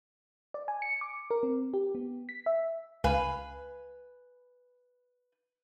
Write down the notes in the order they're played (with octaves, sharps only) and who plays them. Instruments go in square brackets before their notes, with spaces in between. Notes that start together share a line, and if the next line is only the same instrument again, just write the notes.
[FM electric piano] D5
G#5
C#7
D6
A#4
C4
G4
B3
B6
E5
[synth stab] C#2 F5 [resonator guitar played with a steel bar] B4 G#5